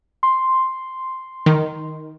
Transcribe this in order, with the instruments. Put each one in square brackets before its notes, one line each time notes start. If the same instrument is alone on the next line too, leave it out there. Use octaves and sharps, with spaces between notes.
[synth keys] C6
[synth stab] D#3